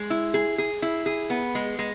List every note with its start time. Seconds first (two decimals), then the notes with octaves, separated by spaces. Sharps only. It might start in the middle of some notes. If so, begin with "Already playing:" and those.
Already playing: G#3
0.10 E4
0.34 G#4
0.58 G#4
0.82 E4
1.06 G#4
1.30 B3
1.55 G#3
1.79 G#3